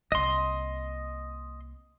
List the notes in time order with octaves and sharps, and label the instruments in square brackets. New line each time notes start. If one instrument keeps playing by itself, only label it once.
[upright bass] C2 A#3 [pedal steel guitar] D#5 C6